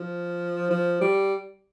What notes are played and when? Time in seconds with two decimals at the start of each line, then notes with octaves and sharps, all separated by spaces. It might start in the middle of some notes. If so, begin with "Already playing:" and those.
Already playing: F3
0.70 F3
1.01 G3